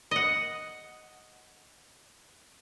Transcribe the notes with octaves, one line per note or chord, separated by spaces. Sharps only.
D#5 F#5